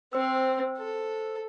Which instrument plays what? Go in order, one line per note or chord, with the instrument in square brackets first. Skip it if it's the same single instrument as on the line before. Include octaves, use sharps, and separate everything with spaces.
[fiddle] C4 [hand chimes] C5 E6
[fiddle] A4